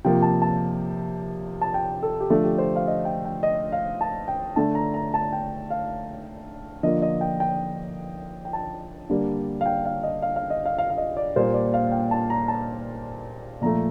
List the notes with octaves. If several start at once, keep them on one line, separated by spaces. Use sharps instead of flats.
C3 F3 A#3 G5
A5
A5
A5
G5
A4
G4
D3 F3 A3 A4
G4
C5
F5
D#5
G5
G5
D#5
F5
A5
G5
D3 A3 A5
A#5
A#5
A5
G5
F5
D3 F3 A#3 D#5
D#5
G5
G5
G5
A5
D3 G3 A#3
F5
G5
F5
D#5
F5
F5
D#5
F5
F5
F5
D#5
D5
A#2 G3 A#3 C5
D5
F5
G5
A5
A#5
A5
A#2 F3 A3 A#5